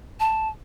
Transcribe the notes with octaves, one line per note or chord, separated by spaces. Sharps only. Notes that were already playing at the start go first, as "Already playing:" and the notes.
A5